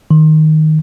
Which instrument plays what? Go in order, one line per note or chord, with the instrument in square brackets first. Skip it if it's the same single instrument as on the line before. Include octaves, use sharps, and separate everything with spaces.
[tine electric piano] D#3